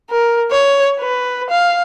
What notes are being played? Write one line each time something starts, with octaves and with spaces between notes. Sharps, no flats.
A#4
C#5
B4
F5